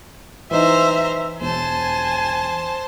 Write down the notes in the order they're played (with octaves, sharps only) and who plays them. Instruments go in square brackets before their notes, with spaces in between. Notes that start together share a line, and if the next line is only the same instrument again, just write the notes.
[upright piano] E3 D#4 [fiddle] C5 A#5 [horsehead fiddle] E5
[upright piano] E1 [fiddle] C5 A5 [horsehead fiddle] G#5